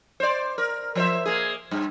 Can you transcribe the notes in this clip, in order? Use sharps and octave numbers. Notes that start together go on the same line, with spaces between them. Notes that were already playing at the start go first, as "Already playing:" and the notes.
C5 D5
A#4
F3 C5 E5
A#3 G#4
G2